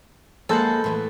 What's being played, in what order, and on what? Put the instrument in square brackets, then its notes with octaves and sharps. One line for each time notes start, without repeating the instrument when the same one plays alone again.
[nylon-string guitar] G#3 A#3 F#5 [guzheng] A4 [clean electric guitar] B4 C5 A5
[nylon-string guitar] A2 D#3 E3